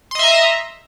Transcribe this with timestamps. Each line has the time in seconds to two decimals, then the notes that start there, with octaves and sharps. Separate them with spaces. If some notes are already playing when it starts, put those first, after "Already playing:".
0.11 C6
0.15 D#5
0.19 E5
0.23 A#5